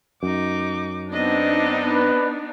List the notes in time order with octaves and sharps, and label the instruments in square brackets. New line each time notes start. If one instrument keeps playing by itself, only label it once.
[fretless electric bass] F#2 [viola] D#4 D6
[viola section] B3 D4 D#4 [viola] C4 D#5
[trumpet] B4